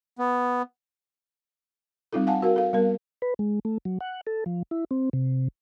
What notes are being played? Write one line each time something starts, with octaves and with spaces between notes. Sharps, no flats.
B3
G3 C4 D#4 F4 A4
F5 F#5 G#5 A5
F#4 A#4 F5
A4 F5
G3 B3 A#4
B4
G#3
A3
F#3
F#5
A4
F3
E4
C4
C3